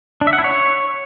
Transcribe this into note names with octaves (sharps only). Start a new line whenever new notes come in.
D4
E5
F#5
E4
C#5